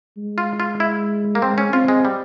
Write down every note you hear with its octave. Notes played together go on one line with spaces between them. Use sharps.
G#3
F4
F4
E4
A#3
G#3 C4
C#4
C4 F4
G#3
G3